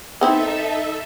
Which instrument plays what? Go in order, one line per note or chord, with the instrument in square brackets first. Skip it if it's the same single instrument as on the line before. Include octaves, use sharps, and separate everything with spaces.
[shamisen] B3 C4 E4 [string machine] D#4 A4 E5